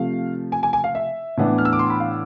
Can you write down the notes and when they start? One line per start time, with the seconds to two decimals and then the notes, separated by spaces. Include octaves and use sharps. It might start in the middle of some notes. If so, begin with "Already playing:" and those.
Already playing: C3 F3 A3 F5
0.52 G#5
0.63 G#5
0.73 G#5
0.84 F5
0.95 E5
1.37 A2 E3 B3 D4
1.58 F6
1.65 E6
1.73 D6
1.79 C6
1.90 B5
2.00 F5